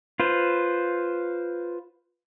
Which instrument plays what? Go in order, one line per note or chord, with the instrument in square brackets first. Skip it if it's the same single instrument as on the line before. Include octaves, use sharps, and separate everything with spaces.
[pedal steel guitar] F4 B4 C5